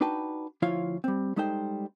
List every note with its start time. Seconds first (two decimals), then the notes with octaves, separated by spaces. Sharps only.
0.01 D4 D#4 F#4 B4 G5 A5
0.62 D2 F3 E4 F4 C#5 F5
1.04 G3 C4
1.36 G3 G#3 D#4 A4 C5 G5